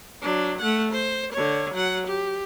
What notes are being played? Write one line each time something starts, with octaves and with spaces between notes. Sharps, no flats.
F#3 D4
A3 F#5
C5
D3 C#5
F#3 F#5
G4